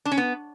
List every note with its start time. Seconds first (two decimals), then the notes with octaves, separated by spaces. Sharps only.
0.06 D4
0.12 C#4
0.18 B3